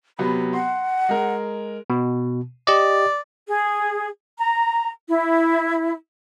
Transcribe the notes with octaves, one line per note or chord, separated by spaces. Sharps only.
C3 F#3 B3 B5
F#5 C6
G#3 A#4
B2
G4 D5 D#5
G#4
A#5
E4